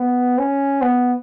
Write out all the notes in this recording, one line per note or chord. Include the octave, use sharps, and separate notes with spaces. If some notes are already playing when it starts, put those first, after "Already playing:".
Already playing: B3
C#4
B3